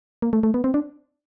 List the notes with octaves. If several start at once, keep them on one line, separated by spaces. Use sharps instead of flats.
A#3
A3
A3
B3
C4
D4